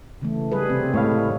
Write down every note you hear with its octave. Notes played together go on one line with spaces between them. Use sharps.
C#3 E3 A3
G3 G#4 B4
C3 C4
A2 G#3 C#5 F5